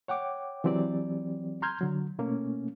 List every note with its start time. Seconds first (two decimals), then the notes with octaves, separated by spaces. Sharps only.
0.08 C#5 F#5 G5 D6
0.64 E3 F#3 C4 G4 D5
1.62 A#5 C6 F6 G6 G#6
1.81 D3 F#3
2.18 B2 A3 A#3 C#4